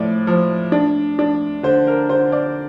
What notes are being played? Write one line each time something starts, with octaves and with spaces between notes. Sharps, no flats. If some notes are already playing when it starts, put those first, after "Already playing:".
Already playing: A2 F3 D5
F3
D4
D4
D3 C5
A#4
D3 C5
D5